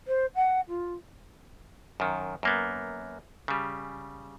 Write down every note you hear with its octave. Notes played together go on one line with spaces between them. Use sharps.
C5
F#5
F4
F#2 D#3
F#2 A#3 B3
C#3 G3